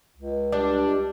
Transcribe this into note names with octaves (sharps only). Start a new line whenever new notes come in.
C#2
G3 D4